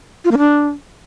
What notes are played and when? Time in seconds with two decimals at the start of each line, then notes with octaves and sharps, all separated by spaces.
0.25 F4
0.31 A#3
0.38 D4